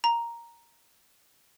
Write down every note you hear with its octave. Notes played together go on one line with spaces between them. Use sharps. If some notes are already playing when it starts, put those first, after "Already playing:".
A#5